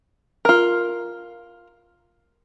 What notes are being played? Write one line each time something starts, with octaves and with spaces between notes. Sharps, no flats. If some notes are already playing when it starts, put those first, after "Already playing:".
F4 A#4